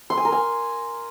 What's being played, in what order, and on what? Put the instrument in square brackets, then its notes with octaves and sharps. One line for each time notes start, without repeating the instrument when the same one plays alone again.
[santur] C6
G#5
A#4
G#5